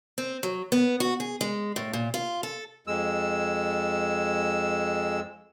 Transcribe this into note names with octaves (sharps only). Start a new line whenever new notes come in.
C4
F#3
B3
F#4
G#4
G#3
A2
A#2
F4
A4
F2 G#3 E6